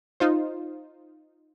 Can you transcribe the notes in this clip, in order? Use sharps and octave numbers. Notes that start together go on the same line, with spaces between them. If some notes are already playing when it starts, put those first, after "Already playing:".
D#4 F4 C5